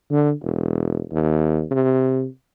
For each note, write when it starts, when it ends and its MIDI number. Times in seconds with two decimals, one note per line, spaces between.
0.10 0.32 50
0.42 1.02 28
1.12 1.63 39
1.71 2.26 48